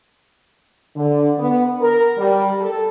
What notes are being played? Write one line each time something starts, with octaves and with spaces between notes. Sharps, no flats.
D3
B3
A#4
G3
A4